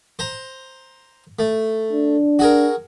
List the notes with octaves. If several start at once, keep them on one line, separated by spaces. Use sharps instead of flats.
C5 A#5
A3
D4
F#4 G#4 A#4